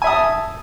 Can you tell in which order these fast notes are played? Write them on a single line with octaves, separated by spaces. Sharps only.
G#5 E5 D#6 A5